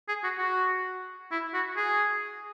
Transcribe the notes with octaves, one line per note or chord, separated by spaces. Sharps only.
G#4
F#4
F#4
E4
F#4
G#4